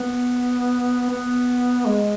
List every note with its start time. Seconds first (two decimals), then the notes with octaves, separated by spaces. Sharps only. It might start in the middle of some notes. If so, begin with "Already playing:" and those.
Already playing: B3
1.10 B3
1.86 G#3